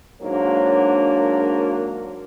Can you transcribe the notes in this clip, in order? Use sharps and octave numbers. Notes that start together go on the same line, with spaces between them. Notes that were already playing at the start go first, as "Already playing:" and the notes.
G#2 F#3 A#3 D4 A#4 C#5